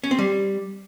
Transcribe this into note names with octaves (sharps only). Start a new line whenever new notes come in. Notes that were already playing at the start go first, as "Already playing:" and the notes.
C#4
C4
G3